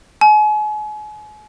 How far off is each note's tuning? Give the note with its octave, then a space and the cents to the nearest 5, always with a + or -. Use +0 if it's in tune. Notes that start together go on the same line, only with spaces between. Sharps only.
G#5 +35